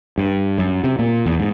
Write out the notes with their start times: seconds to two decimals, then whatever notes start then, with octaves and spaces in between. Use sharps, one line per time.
0.18 G2
0.58 F#2
0.84 C3
0.99 A#2
1.26 E2
1.40 G#2